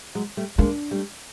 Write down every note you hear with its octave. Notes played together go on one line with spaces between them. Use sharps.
F#3 G#3
G3 A3
G#3 A#3 D4
G3 A3